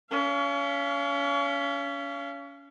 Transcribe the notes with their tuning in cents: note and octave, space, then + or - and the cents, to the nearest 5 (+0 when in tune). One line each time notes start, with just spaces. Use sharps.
C#4 +30 F5 -30